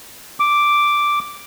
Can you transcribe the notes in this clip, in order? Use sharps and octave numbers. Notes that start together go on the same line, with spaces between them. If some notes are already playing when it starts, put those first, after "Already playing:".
D6